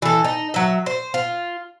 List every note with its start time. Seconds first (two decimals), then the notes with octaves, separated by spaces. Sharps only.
0.02 E3 A4
0.25 D#4
0.54 F#3 E5
0.86 C5
1.14 F4